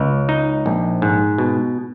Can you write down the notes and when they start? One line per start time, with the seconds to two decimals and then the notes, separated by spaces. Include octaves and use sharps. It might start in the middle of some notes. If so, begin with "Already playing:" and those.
Already playing: C#2
0.29 D#4
0.66 A#1
1.02 G#2
1.38 B2